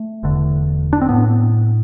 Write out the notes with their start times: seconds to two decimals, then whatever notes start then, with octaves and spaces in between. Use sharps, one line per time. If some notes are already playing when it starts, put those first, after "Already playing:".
Already playing: A3
0.23 E1 E2 D3
0.93 D4
1.01 C4
1.09 A2 B3